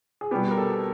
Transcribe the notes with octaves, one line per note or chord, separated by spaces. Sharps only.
G#4
B2 G3 B3 G4
A#4
A4